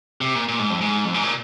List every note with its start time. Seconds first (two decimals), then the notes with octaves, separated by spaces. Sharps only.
0.21 C3
0.35 A#2
0.48 A#2
0.59 G#2
0.70 F2
0.81 G#2
1.05 F2
1.14 G#2
1.23 A#2